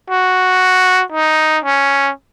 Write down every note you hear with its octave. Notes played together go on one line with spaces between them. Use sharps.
F#4
D#4
C#4